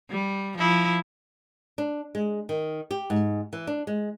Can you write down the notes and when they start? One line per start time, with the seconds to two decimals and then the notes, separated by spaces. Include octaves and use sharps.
0.10 G3
0.57 F3 E4
1.78 D4
2.15 G#3
2.49 D#3
2.91 G4
3.10 G#2
3.53 E3
3.67 D4
3.87 G#3